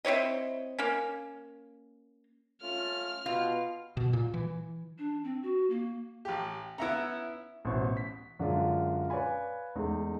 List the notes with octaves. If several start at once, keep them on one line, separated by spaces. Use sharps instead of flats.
C4 E4 C#5 D#5
A#3 C#4
A3 C#4 F4 F6
B2 F4
B2
A#2
E3
D4
C4
F#4
A#3
A1 G4
B3 C#4 E4 E5 A#5
A1 B2 E4 C5 C#6
B6
F#2 D3 G#3 D4 F4
B4 C#5 D5 F5 G#5 B5
E2 G#3 A3 C#4 D#4